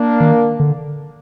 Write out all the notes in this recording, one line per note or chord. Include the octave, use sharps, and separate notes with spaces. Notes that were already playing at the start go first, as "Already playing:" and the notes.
Already playing: A#3 D4
D#3
D3